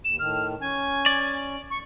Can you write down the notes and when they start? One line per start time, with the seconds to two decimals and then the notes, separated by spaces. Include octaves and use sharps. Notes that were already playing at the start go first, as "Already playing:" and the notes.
0.05 D#2 E7
0.19 A2 D#3 F6
0.61 C#4 G#5
1.06 D5
1.70 C#6